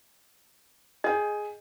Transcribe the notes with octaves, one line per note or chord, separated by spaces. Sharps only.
G#4 D#5 G5